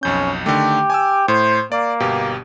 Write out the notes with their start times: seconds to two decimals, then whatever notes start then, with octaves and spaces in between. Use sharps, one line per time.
0.03 B1 F2 C#4 G6
0.46 D3 D#3 A3 G4
0.90 G#5 D6 E6
1.28 A2 C5
1.72 A#3 D5
2.00 G1 B2 G4